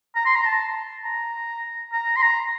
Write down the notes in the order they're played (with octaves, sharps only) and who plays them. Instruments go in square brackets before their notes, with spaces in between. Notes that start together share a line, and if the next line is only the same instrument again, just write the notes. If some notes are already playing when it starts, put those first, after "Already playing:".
[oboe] A#5
C6
A#5
A5
A#5
A#5
C6
A#5